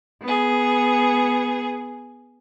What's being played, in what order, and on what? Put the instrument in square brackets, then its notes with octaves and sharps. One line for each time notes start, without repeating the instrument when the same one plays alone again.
[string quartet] B3 G#4